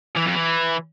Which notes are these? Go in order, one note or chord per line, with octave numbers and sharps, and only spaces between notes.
E3
F2
E3